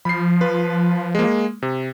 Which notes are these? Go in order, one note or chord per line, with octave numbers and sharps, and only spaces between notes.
F3 B5 C7
F4 B4
G#3 A#3
C3